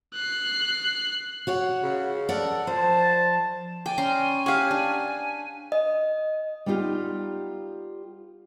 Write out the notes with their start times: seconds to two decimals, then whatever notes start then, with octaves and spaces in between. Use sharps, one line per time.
0.14 F#6 C7
1.47 F#4 C#5 F#5
1.82 C#3
2.29 A4 A#4 D5 F#5
2.67 F3 C5 A5
3.86 D5 G5 G#5
3.98 C#4 A#5 C6
4.46 G4 C#5 F5 F#5
4.71 D4
5.72 D#5
6.66 G3 B3 D#4 F4 G4